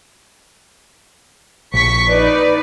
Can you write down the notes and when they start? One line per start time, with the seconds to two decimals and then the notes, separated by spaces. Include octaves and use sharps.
1.74 A#1 C#6 B6 C#7
2.09 D#4 B4 D5